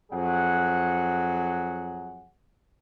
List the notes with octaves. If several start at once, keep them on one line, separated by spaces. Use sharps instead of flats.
F2 F#3 G#4 F#5